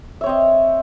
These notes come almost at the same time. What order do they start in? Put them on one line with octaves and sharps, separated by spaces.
E5 C#5 C4 D#5